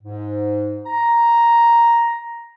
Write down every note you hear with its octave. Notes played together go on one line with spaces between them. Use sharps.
G#2
A#5